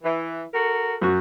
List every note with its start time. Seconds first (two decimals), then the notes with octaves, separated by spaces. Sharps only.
0.03 E3
0.53 F#4 A4 A#4
1.01 F#2 F#4